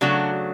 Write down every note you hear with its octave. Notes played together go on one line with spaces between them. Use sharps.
C#3 F#3 A3 D4 F#4